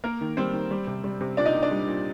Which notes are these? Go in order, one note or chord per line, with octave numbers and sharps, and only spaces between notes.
A#3 A#4
D#3
G3 C4 C5
D#3
G3
C3
G3
C3
A#2 D4 D5
D#4 D#5
A#2
D4 D5
G3
A#2